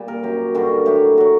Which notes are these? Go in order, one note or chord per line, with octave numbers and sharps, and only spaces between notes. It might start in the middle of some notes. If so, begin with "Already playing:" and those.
Already playing: A#2 G3
A#4
F#2 F#3 G4
G2 D3 G3 F#4
A2 F#3 G4
F#3 F#4